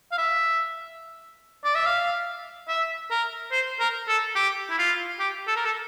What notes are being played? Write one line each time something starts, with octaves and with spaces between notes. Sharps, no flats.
F5
E5
D5
E5
F5
E5
A#4
C5
A#4
A4
G4
E4
F4
G4
A4
A#4
A4